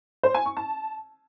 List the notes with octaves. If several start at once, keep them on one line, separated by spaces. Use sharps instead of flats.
C5
G#5
C#6
A5